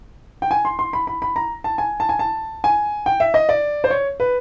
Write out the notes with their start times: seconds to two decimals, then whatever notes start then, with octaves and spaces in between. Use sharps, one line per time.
0.42 G5
0.51 G#5
0.65 C6
0.79 C6
0.93 B5
1.07 B5
1.22 B5
1.36 A#5
1.64 A5
1.78 G#5
2.00 A5
2.09 G#5
2.19 A5
2.64 G#5
3.06 G5
3.20 E5
3.34 D#5
3.49 D5
3.84 C5
3.90 C#5
4.20 B4